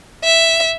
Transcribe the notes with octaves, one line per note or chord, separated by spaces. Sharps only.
E5